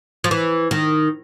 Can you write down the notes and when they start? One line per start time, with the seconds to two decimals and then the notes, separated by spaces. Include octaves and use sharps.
0.24 F3
0.31 E3
0.71 D#3